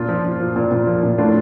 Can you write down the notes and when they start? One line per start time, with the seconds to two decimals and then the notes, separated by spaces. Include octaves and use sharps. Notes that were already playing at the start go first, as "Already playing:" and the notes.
Already playing: A#2 D4 F4
0.09 F3
0.25 F3
0.40 F3
0.56 A#2
0.71 A#2
0.87 F3
1.03 A#2
1.18 A2 D4 F4